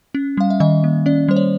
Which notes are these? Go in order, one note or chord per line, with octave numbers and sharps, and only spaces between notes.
C#4
G3 F5
E5
D#3 D#5
A#3
C#4 D5
G3 C5
C#5